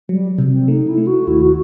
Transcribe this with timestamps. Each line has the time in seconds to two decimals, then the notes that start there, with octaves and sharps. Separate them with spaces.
0.09 F#3 G3
0.39 C3
0.49 C4
0.68 A3 D#4
0.88 E4
0.98 A3
1.07 F#4
1.27 D#2 E4
1.42 F#4